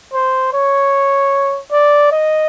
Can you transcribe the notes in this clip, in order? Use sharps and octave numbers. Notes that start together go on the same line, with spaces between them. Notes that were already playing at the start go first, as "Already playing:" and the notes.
C5
C#5
D5
D#5